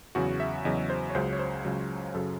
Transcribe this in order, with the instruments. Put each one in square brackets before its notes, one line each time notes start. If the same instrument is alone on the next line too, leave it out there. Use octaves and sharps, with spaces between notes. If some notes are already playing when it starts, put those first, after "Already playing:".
[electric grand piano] E2 C#3 F#3 F#4
E5
E2 C#3 F#3 D#5
C5
C#5
C#2 C#3 F#3 C5
C#5
C5
C#2 C#3 F#3
F#2 C#3 F#3 A4